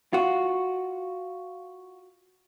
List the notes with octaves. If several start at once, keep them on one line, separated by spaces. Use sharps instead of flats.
F4 F#4